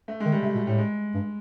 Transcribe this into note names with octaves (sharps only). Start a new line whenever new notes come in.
A3
G#3
D#3
G3
C3 A3
B2
A2 G3
G#3
G2